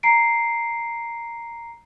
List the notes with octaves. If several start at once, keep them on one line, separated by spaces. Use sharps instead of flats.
A#5 C7 D7